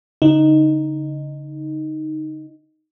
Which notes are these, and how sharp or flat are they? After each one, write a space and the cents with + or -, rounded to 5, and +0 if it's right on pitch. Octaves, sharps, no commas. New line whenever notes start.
D3 -45 D#4 +0